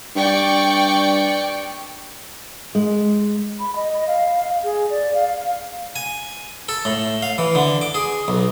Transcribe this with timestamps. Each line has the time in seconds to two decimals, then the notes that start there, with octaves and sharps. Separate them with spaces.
0.16 G2 D5 G5 C#6
2.75 G#3
3.60 B5
3.76 D#5
4.08 F5
4.64 G#4
4.90 D5
5.14 F5
5.96 G#5
6.69 A4
6.85 A2
7.23 F5
7.38 E3
7.55 D3
7.81 D6
7.95 G#4
8.28 B1